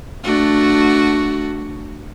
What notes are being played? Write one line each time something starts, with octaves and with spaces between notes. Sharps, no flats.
A3 D4 F#4